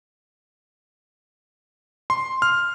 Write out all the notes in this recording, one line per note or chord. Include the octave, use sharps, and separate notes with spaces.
C6
F6